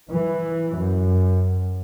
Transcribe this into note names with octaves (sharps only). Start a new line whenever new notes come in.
E3
F#2